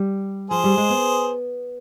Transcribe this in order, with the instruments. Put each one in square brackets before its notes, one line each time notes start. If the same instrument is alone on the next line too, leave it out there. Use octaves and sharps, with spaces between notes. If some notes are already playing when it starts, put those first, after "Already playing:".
Already playing: [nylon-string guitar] G3
[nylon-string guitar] F3 [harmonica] G#4 C5
[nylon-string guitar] G3
G#3
B3